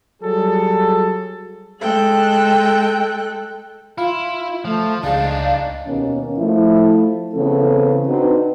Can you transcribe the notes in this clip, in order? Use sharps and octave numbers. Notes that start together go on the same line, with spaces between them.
F#3 G3 G#4 A4
G#3 A4 G5 F#6
E4 F4 F5
F3 A3
C#2 D4 D#4 G#4 D5 F5
D#2 B2 A#3 C#4
F3 A3 E4
C#3 E3 B3 C4 A4
C4 D4 D#4 F#4 B4